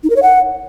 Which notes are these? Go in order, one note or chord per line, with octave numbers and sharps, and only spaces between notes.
D#4
A#4
C#5
F#5